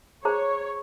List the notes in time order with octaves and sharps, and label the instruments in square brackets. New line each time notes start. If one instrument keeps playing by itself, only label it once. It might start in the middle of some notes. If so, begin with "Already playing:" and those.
[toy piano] G#4 C5 A#5 [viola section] C#5